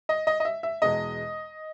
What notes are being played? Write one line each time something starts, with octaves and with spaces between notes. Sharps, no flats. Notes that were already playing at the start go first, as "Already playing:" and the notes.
D#5
D#5
D#5
E5
E5
E2 B2 G#3 D#5